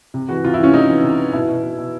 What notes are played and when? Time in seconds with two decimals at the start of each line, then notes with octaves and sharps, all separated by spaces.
0.14 C3
0.29 E3 F#4
0.44 C3 F4
0.54 E4
0.59 E3 C#4
0.74 C3 D#4
0.89 E3
1.03 C3
1.18 E3
1.33 B2 E4
1.48 B2
1.63 B2
1.78 B2